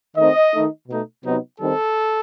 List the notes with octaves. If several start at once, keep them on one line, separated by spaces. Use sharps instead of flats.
D#3 A3 C4 D#4 D#5
D#3 A3 D#4
B2 A3 D#4
C3 F#3 B3 D#4
D#3 G3 C4 D#4 A4